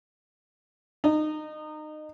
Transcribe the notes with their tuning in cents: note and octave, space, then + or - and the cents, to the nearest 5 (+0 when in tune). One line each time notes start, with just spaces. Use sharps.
D#4 -25